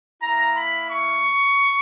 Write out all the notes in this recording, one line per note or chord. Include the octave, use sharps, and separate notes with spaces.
A#3 E4 A#5
B5
C#6